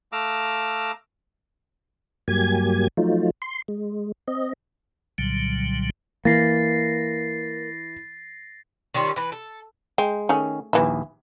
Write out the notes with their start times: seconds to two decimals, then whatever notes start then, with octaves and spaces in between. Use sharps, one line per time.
0.12 A3 F5 A#5 D6 E6
2.28 G2 F#3 A#3 G4 G#5 G#6
2.97 F3 F#3 A3 D#4 F4
3.42 C6
3.68 G#3
4.28 C4 D#5
5.18 C2 A#2 D3 F#3 G3
6.25 E3 A#3 A6 A#6 C7
8.94 D#3 G3 C#4 F4
9.16 E3 B4
9.32 A4
9.98 G#3 G5
10.29 D#3 A3 C#4 G#4
10.73 A#1 D#2 E3 E4